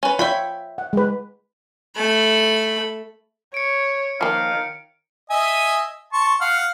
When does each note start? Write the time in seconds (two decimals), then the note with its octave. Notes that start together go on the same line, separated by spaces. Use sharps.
0.03 C#4 B4
0.19 F4 C#5 E5 G5 B5
0.78 F#5
0.93 G#3 B4
1.96 A3 B5
3.54 C#5 C#7 D7
4.21 D#3 F3 A#3 F5
5.30 D#5 E5 G#5
6.13 A5 C6 C#6
6.41 F5 F#5 F6